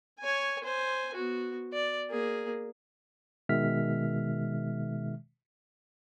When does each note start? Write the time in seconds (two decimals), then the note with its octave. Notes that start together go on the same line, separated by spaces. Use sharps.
0.19 C#5 G#5
0.64 C5 G#5
1.14 B3 F#4
1.73 D5
2.10 A#3 G#4
3.49 B2 D#3 G#3 E5 F6 B6